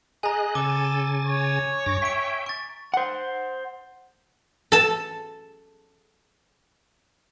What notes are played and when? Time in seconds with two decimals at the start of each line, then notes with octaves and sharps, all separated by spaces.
0.23 G#4 D#5 G#5 A#5 F#6
0.55 C#3 A4 G#5 D6 A6 G7
1.26 C#5
1.86 G2 D6 A#6
2.02 E5 G5 B6 D7
2.46 C#6 A6
2.94 C5 F#5
4.72 A4 A5